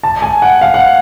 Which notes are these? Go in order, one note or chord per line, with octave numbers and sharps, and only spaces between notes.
A5
G#5
F#5
F5
F#5